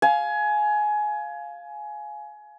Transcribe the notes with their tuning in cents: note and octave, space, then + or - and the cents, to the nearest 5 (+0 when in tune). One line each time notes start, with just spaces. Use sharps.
F5 +0 G#5 +20